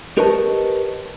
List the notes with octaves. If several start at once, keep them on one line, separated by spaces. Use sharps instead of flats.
G4 A#4 B4 C#5 D#5 A5